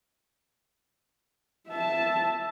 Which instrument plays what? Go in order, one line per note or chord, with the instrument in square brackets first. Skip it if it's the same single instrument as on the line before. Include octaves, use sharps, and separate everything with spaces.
[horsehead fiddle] E5 A5